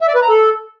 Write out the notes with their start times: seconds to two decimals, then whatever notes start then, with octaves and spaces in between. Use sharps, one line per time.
0.01 E5
0.08 D5
0.15 B4
0.22 A#5
0.29 A4